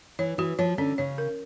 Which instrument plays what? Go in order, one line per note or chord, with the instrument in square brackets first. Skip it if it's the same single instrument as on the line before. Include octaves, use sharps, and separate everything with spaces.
[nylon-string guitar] E3 [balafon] C#5
[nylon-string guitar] E3 [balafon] F#4
[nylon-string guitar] F3 [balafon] C#5
[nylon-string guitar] D3 [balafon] C#4
[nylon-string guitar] C#3 [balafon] C#5
[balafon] A#4